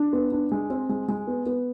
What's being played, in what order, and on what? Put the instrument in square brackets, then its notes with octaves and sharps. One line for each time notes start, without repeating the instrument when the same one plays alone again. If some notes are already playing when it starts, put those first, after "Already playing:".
Already playing: [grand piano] D4
B3
D4
G#3
C4
G#3
G#3
B3
B3